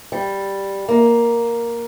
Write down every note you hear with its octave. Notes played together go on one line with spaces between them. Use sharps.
G3
A#3